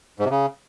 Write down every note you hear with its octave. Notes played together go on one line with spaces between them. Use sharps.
G#2
C3
C#3